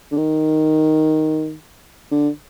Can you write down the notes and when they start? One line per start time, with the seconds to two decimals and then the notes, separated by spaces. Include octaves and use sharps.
0.11 D3
0.17 D#3
2.11 D3